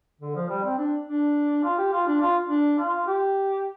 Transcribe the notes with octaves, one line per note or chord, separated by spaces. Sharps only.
D3
F3
G3
C4
D4
D4
F4
G4
F4
D4
F4
D4
F4
G4